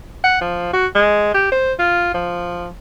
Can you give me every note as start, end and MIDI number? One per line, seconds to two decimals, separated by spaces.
0.24 0.37 78
0.41 0.72 53
0.73 0.87 66
0.95 1.31 56
1.34 1.48 67
1.52 1.73 72
1.79 2.12 65
2.14 2.68 53